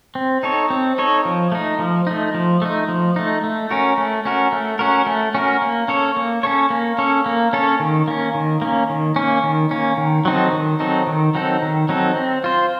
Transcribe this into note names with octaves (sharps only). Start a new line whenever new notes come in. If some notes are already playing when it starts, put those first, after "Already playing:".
C4
D#4 A4 C#5
C4
D#4 A4 C#5
F3
A3 D#4
F3
A3 D#4
F3
A3 D#4
F3
A3 D#4
A3
C#4 F#4 A#4
A3
C#4 F#4 A#4
A3
C#4 F#4 A#4
A3
C#4 F#4 A#4
A#3
C#4 A4 C#5
A#3
C#4 A4 C#5
A#3
C#4 A4 C#5
A#3
C#4 A4 C#5
D#3
A#3 C#4
D#3
A#3 C#4
D#3
A#3 C#4
D#3
A#3 C#4
D#3
F#3 C4 D#4 A4
D#3
F#3 C4 D#4 A4
D#3
F#3 C4 D#4 A4
D#3
F#3 C4 D#4 A4
C4
F4 C5